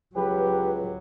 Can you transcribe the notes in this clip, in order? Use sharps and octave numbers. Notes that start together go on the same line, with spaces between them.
C#2 F#3 G4 B4